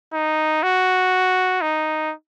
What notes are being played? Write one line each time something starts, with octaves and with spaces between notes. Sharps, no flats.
D#4
F#4
D#4